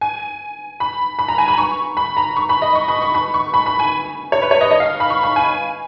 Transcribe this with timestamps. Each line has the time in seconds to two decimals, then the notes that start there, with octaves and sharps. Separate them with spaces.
0.01 G#5
0.80 B5
1.19 B5
1.28 A#5
1.38 G#5
1.48 B5
1.58 C#6
1.97 B5
2.17 A#5
2.36 C#6
2.49 B5
2.62 D#5
2.75 C#6
2.88 B5
3.02 C#6
3.15 B5
3.34 C#6
3.54 B5
3.66 B5
3.79 G#5
4.32 C#5
4.42 B4
4.51 C#5
4.61 D#5
4.71 D#5
4.80 F5
5.00 B5
5.10 C#6
5.23 B5
5.36 G#5